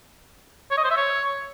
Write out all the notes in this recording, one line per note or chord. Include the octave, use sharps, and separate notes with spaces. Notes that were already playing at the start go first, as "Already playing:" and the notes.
C#5
D#5
C5
E5
C#5